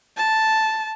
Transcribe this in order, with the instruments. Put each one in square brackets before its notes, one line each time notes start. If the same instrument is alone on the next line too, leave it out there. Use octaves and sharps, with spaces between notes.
[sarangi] A5